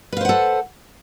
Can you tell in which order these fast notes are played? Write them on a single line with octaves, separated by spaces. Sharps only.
B4 F5 C5 F#5 A4